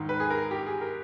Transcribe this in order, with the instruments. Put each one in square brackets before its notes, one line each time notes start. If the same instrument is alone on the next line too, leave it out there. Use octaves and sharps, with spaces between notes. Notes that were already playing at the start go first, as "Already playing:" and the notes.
Already playing: [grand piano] G#2 D#3
B4
G#4
A#4
G4
G#4
A#4